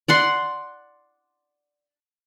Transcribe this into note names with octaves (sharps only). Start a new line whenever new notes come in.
D5 F#5 C6